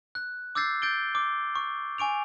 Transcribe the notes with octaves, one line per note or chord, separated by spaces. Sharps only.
F#6
D6 E6 G6 A6 C7
G6 A6 D7 G7
D6
C#6
G#5 C#6 D7 F7